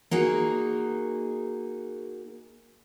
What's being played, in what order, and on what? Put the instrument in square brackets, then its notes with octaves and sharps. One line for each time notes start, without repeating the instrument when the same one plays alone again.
[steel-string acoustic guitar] A#3 D#4 F#4 G#4